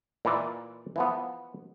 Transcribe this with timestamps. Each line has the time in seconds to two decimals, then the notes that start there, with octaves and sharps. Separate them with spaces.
0.25 A#2 E3 D5
0.96 E3 F3 B3